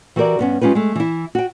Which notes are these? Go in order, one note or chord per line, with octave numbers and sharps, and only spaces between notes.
E3 F#4 G4 A#4 D5
G2 B3 C#4
G#3 C#4 F4 G4 B4
G#3 A3
E3 E4
F#4 G5